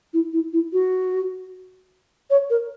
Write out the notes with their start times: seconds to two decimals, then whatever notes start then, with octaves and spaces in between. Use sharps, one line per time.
0.13 E4
0.33 E4
0.53 E4
0.73 F#4
2.30 C#5
2.50 A#4